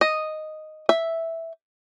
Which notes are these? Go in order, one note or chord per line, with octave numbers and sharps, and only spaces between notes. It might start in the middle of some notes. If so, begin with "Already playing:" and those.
D#5
E5